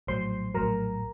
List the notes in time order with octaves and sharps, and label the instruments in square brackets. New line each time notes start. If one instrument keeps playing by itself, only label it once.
[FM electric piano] A#1 A2 F#3 C5 C6
A#1 A2 F#3 A#4 A#5